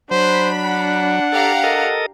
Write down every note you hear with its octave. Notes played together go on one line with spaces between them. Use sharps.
F#3 D4 C5 B5 B6
F#5
G4 A4 F5 A#5
A4 A#4 D#5